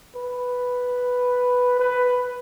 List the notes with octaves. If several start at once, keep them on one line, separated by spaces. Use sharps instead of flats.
B4
B4